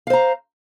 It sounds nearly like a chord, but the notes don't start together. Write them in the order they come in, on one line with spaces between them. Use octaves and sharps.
F5 C5 A#5